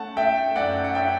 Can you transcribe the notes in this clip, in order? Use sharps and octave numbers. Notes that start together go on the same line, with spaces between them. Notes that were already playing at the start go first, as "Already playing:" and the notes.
Already playing: A3 C#4 F#5 A5
A3 E5 G5
F#2 D5 F#5
F#5
C#4 E5 G5